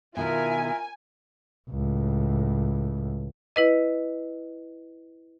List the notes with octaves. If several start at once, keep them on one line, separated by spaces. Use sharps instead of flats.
B2 D#3 E4 F4 A#4 E5 G#5
C#2 A2
E4 B4 D#5